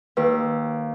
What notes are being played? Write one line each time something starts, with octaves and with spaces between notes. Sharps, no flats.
D#2 B4